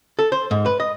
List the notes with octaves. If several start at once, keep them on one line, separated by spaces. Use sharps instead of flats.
A4
C5
G#2
B4
D#5